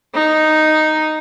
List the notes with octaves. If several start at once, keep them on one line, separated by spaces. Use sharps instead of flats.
D#4